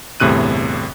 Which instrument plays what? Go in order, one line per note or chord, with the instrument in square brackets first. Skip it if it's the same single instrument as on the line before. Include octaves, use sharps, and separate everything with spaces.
[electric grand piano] G1 E2 A2 C3 F#6 D#7